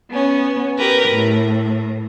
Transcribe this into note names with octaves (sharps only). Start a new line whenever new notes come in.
B3 C#4
G4 A#4 B4
A2